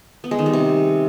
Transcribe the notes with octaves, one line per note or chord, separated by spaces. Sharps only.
B3
G#3
D#3
G3
C3